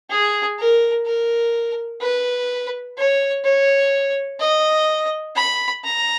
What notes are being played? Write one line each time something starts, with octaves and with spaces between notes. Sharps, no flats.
G#4
A#4
A#4
B4
C#5
C#5
D#5
B5
A#5